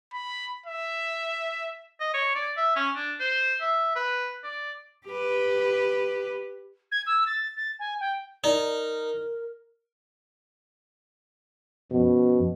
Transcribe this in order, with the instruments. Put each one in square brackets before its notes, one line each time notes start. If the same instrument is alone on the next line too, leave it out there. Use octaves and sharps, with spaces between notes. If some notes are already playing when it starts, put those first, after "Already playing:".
[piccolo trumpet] B5
E5
[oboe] D#5
C#5
D5
E5
C#4
D4
C5
E5
B4
D5
[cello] G4 B4
[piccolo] G#6
E6
A6
A6
G#5
G5
[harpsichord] D#4 [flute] A#4 [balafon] D5
[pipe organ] F#2 F3 [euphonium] B2